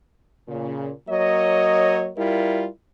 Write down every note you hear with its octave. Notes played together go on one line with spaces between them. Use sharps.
A#2 C#3
F#3 A#3 C#5 D#5
G3 E4 F4 A#4